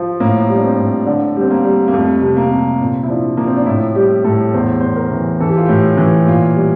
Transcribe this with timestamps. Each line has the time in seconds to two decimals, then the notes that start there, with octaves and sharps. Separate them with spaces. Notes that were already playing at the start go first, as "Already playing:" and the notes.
Already playing: F3
0.20 A2 A#3
0.49 G3
0.56 D4
0.64 C4
0.78 A2
1.06 D3 D4
1.36 G3
1.41 C4
1.51 A#3
1.64 G3
1.88 A#3
1.93 F2 A3
2.22 C3
2.37 A#3
2.51 C3
2.80 A#2 C4
3.03 E4
3.08 F3 D4
3.37 F3 A#3
3.47 C4
3.57 D4
3.66 A2 E4
3.95 G3 G4
4.24 A2 A4
4.54 E2 C5
4.80 E2 C5
4.96 A#4
5.12 E3
5.40 E3 A4
5.48 G4
5.57 F4
5.66 A2 G4
5.97 E3
6.26 A#2 F4
6.56 G3